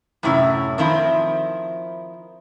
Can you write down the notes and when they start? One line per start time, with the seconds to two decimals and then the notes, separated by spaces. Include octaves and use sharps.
0.23 F#2 A2 C3 C#4 E4
0.78 D#3 F3 C4 E4